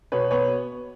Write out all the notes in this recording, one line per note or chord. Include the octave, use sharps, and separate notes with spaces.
B2 B4 C#5
B3 B4 C#5